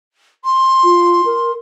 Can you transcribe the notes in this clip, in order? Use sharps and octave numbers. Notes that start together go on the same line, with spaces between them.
C6
F4
A#4